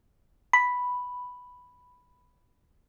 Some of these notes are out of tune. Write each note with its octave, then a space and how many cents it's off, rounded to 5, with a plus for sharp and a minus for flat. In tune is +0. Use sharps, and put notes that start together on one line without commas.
B5 +0